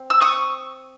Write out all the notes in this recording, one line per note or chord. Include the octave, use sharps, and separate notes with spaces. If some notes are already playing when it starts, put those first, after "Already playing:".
Already playing: C4
E6
C#6 D#6